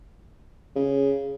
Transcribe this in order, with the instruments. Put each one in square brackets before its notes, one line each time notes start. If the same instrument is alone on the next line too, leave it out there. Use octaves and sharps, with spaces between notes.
[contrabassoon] C#3